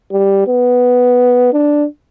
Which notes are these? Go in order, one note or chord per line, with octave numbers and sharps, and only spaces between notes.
G3
B3
D4